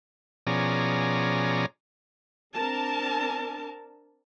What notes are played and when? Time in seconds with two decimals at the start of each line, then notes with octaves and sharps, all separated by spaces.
0.47 B2 F3 C#4 G#4 D5 A#5
2.55 C4 D4 A#4 A5